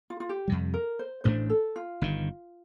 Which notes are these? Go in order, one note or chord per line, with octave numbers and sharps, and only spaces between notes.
F4
F4
G4
F2 C3 G3
A#4
C5
A1 A2 A3 D4 C5
A4
F4
G1 G2 D#3